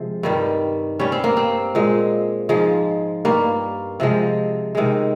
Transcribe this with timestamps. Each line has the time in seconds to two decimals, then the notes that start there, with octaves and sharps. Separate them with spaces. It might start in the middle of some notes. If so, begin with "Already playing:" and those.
Already playing: C3 F3 G#3
0.23 G2 D#3 G3
0.99 G2 G3 C#4
1.12 C4
1.24 A#3
1.37 C4
1.75 A#2 G#3
2.49 G#2 F3 G#3
3.25 G2 G3 A#3
4.00 C3 F3 G#3
4.75 C3 D#3 G#3